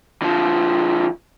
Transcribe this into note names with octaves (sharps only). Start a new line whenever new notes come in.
D3 F3